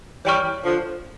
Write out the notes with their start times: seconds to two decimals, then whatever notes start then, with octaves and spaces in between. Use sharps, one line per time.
0.25 E3 G3 C#5 G5 C#6 F6
0.64 D3 F3